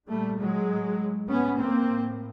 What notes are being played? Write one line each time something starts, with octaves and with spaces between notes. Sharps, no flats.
A#2 G3 A3
F#3 G#3
A2
A2 B3 C#4
A#3 C4
A2